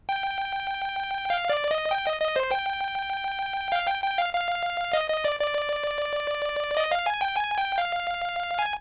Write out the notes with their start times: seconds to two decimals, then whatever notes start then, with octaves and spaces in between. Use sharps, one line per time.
0.09 G5
1.30 F5
1.50 D5
1.71 D#5
1.91 G5
2.06 D#5
2.21 D#5
2.36 C5
2.51 G5
3.72 F5
3.87 G5
4.04 G5
4.18 F5
4.33 F5
4.93 D#5
5.10 D#5
5.24 D5
5.40 D5
6.77 D#5
6.92 F5
7.06 G#5
7.21 G5
7.37 G#5
7.58 G5
7.78 F5
8.59 G#5